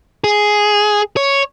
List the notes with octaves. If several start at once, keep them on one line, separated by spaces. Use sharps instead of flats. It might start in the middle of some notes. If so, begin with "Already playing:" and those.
G#4
C#5